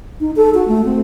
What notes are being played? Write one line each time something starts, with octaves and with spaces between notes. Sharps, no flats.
D#4
A4
F#4
A3
C4